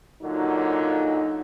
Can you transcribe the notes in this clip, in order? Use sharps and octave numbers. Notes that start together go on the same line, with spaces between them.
A#2 D3 F#3 D#4